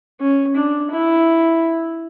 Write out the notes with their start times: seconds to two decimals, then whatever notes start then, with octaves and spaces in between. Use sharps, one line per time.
0.21 C#4
0.56 D4
0.91 E4